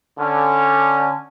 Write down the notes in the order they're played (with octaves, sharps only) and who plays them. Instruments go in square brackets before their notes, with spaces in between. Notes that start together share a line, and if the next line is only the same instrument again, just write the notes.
[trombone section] D3 C#4